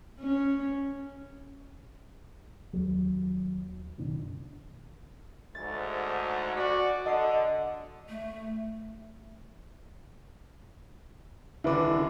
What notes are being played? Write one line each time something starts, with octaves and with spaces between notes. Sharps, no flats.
C#4
D#2 F#3
F#1 B2 D#3 D4
D2 G#2 A6
F#4 D5 B6
D3 D#5 A5 C7
A3
D#1 D3 D4 E4 B4 D6